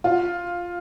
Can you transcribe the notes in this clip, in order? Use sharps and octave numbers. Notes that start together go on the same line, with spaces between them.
F4